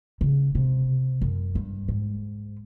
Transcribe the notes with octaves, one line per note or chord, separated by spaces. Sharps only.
C#3
C3
F#2
G2
G#2